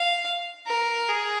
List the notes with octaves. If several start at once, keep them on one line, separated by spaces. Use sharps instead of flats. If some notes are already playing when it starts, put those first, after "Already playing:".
Already playing: F5
A#4
G#4